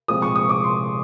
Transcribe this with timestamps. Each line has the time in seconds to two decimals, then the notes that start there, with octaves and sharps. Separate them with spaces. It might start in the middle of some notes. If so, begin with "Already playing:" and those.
0.08 A#2 F3 G#3 C4 D#6
0.22 C#6
0.36 D#6
0.49 D6
0.64 C6